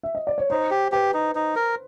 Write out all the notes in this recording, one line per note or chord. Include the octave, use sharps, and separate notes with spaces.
E5
D#5
D5
C#5
D#4 C5
G4
G4 B4
D#4
D#4
A#4